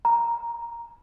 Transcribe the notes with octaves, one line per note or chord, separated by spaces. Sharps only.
A#5